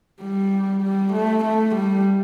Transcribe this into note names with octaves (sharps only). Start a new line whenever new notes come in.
G3
G3
A3
A3
G3